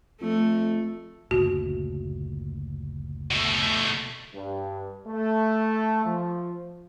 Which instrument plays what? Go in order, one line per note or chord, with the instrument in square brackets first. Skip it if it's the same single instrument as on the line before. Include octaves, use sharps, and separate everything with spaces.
[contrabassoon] F2 [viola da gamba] A3
[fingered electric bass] F#1 D2 A#2 [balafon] F#4
[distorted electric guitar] B2 A3
[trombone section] G2
A3
F3